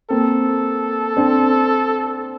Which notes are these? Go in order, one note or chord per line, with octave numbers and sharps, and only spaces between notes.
A#3 C4 A4
C4 D4